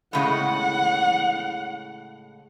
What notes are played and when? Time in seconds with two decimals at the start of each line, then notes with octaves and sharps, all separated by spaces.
0.13 A2 C#3 G#3 F#5